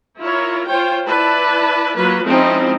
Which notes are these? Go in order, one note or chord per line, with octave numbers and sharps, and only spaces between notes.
E4 F4 A#4 C#5
F4 C5 C#5 G5
E4 B4 D5 A5
F#3 A#3 F4 B4
F3 G#3 C4 C#4 D#4 E4